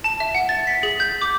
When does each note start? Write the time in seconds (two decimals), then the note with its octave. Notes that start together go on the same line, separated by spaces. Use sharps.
0.04 A5
0.20 E5
0.35 F#5
0.49 A6
0.67 B6
0.83 G#4
1.00 G6
1.22 D6